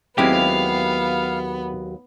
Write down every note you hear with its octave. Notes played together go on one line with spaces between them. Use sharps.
D#2 F#3 G#3 B3 C4 E4 G4 F5